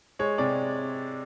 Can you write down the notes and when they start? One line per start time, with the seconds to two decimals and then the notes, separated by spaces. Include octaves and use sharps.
0.19 G#3 C#5
0.38 C3 D5